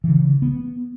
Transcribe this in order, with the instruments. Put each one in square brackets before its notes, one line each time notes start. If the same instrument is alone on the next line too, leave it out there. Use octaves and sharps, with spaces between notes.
[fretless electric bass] C#3 E3
B3